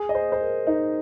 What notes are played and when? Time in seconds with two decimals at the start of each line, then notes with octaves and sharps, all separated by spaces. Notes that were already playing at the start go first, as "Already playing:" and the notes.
Already playing: G#4
0.09 D#5
0.15 C5
0.32 C5
0.41 A#4
0.67 D#4